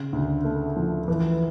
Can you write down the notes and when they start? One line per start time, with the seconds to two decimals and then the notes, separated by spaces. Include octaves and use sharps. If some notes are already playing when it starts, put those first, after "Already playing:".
Already playing: C#3
0.13 D2
0.44 A3
0.76 F3
1.08 E3